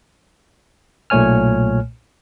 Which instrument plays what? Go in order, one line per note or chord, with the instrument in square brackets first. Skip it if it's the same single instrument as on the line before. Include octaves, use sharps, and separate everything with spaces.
[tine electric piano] B1 A#2 A3 C#5 G#5 F6